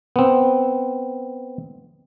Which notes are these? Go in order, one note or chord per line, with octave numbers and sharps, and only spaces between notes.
B3 C4